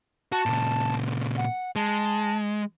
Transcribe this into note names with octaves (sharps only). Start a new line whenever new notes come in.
F#4 A5
A#2 C#3
F#5
G#3 A5